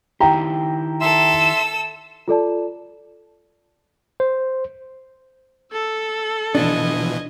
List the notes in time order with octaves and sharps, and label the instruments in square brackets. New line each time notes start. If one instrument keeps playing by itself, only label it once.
[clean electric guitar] D#3 E4 G4 [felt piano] G5 A#5
[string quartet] A4 E6 [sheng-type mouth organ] E5 C6
[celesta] F4 A4 D5 A5
[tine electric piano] C5
[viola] A4 [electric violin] E6
[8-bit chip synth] B2 E3 F3 [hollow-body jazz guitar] D4 [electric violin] D#5 G#6